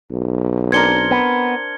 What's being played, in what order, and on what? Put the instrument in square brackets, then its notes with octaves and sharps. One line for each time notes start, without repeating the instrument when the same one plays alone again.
[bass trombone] B1
[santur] C4 D4 A#4 [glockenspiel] G#6 C#7 G7
[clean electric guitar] B3